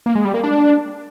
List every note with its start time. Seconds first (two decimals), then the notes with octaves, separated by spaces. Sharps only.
0.06 A#3
0.15 G#3
0.25 G3
0.34 A#3
0.43 D4